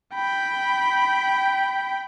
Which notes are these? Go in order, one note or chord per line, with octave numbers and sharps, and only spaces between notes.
G5 B5